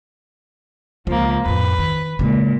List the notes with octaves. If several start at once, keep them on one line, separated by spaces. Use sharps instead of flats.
C#2 F3 A#3
F2 A2 B4
D#3
A#2 C#3 G#3